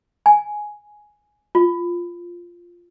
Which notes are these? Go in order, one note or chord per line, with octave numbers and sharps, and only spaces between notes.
G#5
F4